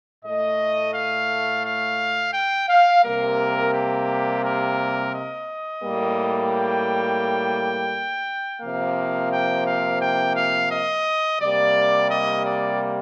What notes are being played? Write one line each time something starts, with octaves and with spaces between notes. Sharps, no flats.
A2 A3 D#5
F5
F5
G5
F5
C3 G3 A#3 A#4
G4
A#4
D#5
A2 G3 A#3
G5
C3 F3 A#3 F5
G5
F5
G5
F5
D#5
C3 G3 A#3 D5
D#5
D5